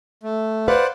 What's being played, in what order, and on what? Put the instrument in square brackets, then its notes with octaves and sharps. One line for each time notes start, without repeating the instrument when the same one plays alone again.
[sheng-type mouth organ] A3
[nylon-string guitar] B4 F5 [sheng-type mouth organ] C5 D5 F#5